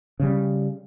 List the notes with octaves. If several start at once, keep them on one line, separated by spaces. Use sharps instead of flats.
C#3 G3